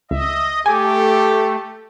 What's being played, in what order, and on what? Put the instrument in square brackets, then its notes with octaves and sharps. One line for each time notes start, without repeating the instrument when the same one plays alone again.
[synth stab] C#2 [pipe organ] D#5 [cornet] E5
[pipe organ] A3 [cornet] G4 [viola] A4 D6 [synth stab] G#5